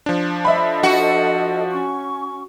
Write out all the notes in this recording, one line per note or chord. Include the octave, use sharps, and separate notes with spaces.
F3 D4
A4 D#5 E5 B5
F#4
C#4 C#6